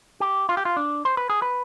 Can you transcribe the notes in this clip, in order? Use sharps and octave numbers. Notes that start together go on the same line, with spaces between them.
G4
F4
G4
F4
D4
C5
B4
G#4
B4